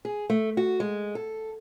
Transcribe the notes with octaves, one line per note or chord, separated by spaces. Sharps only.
G#4
A3
F#4
G#3
A4